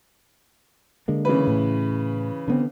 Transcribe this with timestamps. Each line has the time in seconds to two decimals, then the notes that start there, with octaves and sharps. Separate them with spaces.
1.08 D3 G#3 A#3
1.25 C#3 E3 B4
1.47 A2
2.48 D3 B3 C4